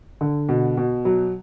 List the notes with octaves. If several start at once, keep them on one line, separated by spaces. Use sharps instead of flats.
D3
B2
B2
F#3